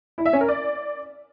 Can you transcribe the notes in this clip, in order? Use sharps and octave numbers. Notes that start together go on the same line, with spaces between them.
E4
E5
C#4
A#4
D5